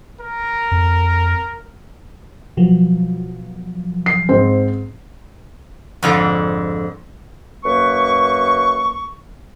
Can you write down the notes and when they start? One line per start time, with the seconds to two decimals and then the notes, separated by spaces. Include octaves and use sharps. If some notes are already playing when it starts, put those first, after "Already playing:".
0.20 A#4
0.71 F2
2.57 B2 F3 F#3
4.06 C7
4.29 G#2 C4
6.03 F2 G#2 D3
7.65 F#2 A#3 B4 C#6